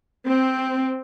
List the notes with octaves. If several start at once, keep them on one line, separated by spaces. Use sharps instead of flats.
C4